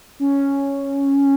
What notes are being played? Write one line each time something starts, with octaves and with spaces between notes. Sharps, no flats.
C#4